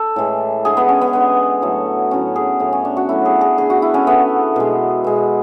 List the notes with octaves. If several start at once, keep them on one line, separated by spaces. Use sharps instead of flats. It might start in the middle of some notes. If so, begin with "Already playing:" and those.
Already playing: A4
A2 E3 G#3
D3 G#3 G#4
B3
C#4
B3
D3 G#3 B3
A2 F#3 A3
A2 F#3 A3 C#4
G#4
A2 F#3 A3 C#4
C#4
D4
F#4
A2 F#3 A3 E4
G#4
G#4
D3 A3 G#4
F#4
E4
C#4
D3 A3 B3
B2 G#3
B2 G#3